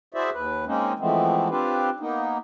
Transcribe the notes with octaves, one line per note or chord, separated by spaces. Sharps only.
E4 F#4 G#4 C5 D5 E5
D#2 B4
G#3 A#3 C4 C#4 D#4
E3 F3 G#3 A3 B3 C4
C4 D4 F4 G4 B4
A#3 B3 D#4